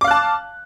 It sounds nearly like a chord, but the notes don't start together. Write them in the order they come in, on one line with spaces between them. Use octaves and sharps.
D6 F5 F#6 A5